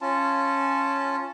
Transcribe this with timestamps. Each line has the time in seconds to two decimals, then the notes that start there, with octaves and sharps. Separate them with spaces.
0.01 C#4 F4 A5